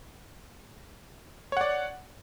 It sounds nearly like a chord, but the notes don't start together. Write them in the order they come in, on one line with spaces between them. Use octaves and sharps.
C#5 F#5 D5